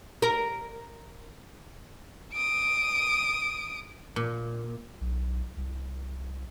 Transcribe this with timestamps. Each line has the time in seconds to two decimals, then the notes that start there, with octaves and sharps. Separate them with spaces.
0.22 A#4
2.33 D#6 D7
4.16 A#2
5.01 B1
5.57 C2